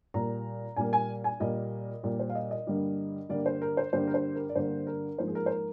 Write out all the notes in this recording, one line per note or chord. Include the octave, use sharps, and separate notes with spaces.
A#2 G3 A#3 A#5
A#2 G3 A#3 G#5
G#5
G#5
A#2 G3 A#3 D#5
A#2 G3 A#3
C5
F5
D#5
D#5
G2 D3 G3 A#3
G2 D3 G3 A#3 D5
C5
A#4
C5
G2 D3 G3 A#3 C5
A#4
C5
A#4
D5
G2 D3 G3 A#3 C5
A#4
G#2 F3 A#3 C5
G#4
A#4
C5
A#4